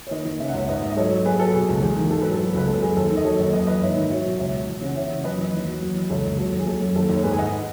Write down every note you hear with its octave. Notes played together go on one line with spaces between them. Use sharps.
C#5
D#3 B4 D#5
D#3
C#3 E5
F#5
C#2 C#5 E5
G#2 B4 D#5
G#2 E5
D#5
F#3 A4 C#5
F#3
F#3 G#4 B4
B4
F#3 A4
B2 G#4
C#2
E2 G#4
D#3
G#2 A4
F#3 B4
A4
F#3
C#2 B4
F#2 A4
F#2 G#4
D#2 A4
D#3
D#5
F#3 A4 C#5
D#2
F#2 B4 D#5
E3 B4 D#5
G#2 C#5 E5
D#3
F#3 C#5 E5
B2
C#2 C#5 E5
B2
E3
C#3 F#5
E3 C#5 E5
C#3
F#2 B4 D#5
E3
D#2
F#3
F#3
E2
C#2 A4 C#5
C#2
F#3 A4
D#2
G#4
F#3 A4
F#2
D#2 A4
D#2
C#5
G#2 G#4 B4
G#5
G#2 D#5 F#5